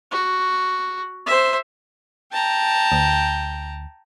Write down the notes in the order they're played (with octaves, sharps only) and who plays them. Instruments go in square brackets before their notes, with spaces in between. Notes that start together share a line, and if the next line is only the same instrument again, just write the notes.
[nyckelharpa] F#4
C5 E5
[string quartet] G5 A5 A#5
[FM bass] D2